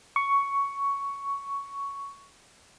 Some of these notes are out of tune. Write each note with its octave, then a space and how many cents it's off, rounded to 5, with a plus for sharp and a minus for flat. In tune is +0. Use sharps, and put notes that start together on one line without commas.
C#6 +10